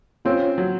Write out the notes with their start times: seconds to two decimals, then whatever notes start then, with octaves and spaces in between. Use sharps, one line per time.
0.25 C4 C#4 F4
0.58 F#3